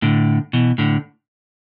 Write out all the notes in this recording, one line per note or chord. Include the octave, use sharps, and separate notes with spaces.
A2 D3
B2 E3
A2 D3